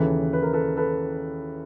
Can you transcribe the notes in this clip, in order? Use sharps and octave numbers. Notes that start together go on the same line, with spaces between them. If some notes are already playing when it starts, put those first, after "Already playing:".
Already playing: D#2 C#3 E3 A4 B4
B4
A#4
A4 B4
A4 B4